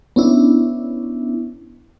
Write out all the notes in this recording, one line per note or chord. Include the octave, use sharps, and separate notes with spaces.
B3 C#4 D4 E4